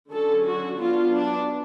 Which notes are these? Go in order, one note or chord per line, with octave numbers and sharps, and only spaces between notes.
D3 F#3 C#4 A4
F#4
F#3 B3 D4 F4
D4